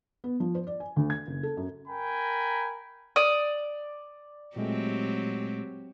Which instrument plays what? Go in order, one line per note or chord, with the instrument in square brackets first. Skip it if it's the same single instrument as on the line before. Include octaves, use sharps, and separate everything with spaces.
[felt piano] B3
F3
C5
D5
G#5
D2
G#6
F#1
A4
F#2
[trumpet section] A#4 G5 G#5 A#5 B5
[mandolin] D5 D#6
[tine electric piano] A#2 G#3 A3 [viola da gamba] F#3 C4 G4